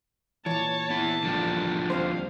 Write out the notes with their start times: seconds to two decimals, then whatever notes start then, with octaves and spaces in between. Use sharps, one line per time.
0.46 A#2 E3 C#5 A5
0.90 B3 E4
1.24 D3 F3 G3
1.90 D#2 C4 C5 F5